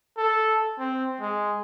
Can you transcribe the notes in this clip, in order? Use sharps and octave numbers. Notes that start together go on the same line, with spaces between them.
A4
C4
G#3